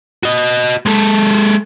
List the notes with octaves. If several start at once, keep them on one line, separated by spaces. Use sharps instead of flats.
F#4 D#5
G#3 A4